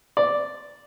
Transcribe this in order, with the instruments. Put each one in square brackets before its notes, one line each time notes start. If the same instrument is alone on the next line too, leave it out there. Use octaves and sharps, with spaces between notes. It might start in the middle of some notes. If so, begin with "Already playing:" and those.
[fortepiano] D5